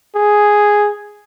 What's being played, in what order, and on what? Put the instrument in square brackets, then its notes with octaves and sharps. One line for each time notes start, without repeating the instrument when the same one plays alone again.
[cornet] G#4